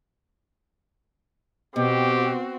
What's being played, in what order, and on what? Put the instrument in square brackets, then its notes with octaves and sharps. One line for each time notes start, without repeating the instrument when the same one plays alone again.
[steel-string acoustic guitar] B2 [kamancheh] C4 F#4 [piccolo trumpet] G4